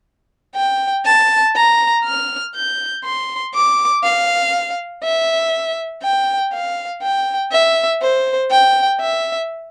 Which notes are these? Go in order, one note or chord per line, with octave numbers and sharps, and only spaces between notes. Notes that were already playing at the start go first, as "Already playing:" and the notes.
G5
A5
A#5
F6
G6
C6
D6
F5
E5
G5
F5
G5
E5
C5
G5
E5